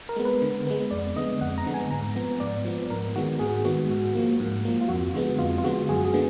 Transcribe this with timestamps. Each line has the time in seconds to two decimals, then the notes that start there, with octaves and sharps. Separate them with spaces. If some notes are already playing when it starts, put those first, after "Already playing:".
0.09 A#4
0.16 G#3 B3
0.25 B4
0.42 D3
0.67 G#3 B3
0.91 F2 D5
1.16 D3 G#3 B3 D#5
1.41 F2 F#5
1.58 A#5
1.66 D3 G#3 B3
1.74 G#5
1.91 G#2 A#5
2.16 F3 B3
2.40 G#2 D5
2.65 F3 B3
2.90 G#2 A#4
3.15 D#3 G#3 B3 F#4
3.39 G#2 G#4
3.65 D#3 G#3 B3 F#4
3.89 G#2
4.15 F3 A#3
4.40 G#2
4.65 F3 A#3
4.81 F4
4.89 F2 F#4
5.14 D3 G#3 B3
5.39 F2 F4
5.58 F4
5.64 D3 G#3 B3 F#4
5.89 F#2 G#4
6.05 G#4
6.13 D3 G#3 B3